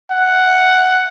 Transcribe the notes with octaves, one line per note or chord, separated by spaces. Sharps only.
F#5